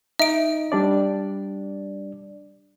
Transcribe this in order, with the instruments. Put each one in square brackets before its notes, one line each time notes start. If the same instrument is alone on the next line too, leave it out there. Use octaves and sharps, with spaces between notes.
[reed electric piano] D#4 [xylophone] E5 D7
[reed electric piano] G3 D4 D5